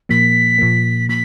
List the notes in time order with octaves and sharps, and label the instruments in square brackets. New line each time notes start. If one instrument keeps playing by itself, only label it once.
[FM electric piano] A#2 F3 A#3 [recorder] B6
[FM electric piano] A#2 F3 A#3
[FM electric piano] A#2 F3 [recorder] B6